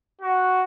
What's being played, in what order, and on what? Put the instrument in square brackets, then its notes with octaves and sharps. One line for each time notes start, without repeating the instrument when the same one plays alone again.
[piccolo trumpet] F#4